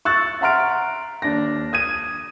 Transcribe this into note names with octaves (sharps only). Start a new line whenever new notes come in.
C#6 E6 F#6 A6
E5 F#5 A#5 C6 F6 D7
D#2 D4 A#6
D#6 G#6 D#7